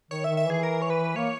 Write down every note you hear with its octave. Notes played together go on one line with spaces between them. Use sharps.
D#3 C#5
D#3 E5
E5
E3 G#4
A#4
C#5
B4
A#3 C#5